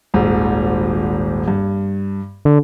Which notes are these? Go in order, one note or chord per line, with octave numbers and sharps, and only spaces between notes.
D#1 G#1 G#2
G2
D3